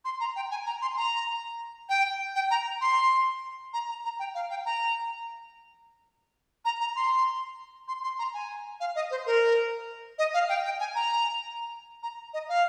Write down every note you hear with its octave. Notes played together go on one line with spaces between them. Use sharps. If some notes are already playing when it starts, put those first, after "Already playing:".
C6
A#5
G5
G#5
A#5
C6
A#5
G5
G5
A#5
C6
A#5
A#5
A#5
G5
F5
G5
A#5
A#5
A#5
C6
C6
C6
A#5
G#5
F5
D#5
C5
A#4
D#5
F5
G5
G5
G#5
A#5
A#5
D#5
F5